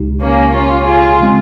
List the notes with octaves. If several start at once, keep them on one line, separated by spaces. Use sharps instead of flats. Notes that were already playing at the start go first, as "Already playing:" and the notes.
Already playing: C#2 C#3 G#3 D#4 G4
A#3 C#4
C#4 F4
F4 G#4
C#3 G#3 C4